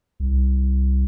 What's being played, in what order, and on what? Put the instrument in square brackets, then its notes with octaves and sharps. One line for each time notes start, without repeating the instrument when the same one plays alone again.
[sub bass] C2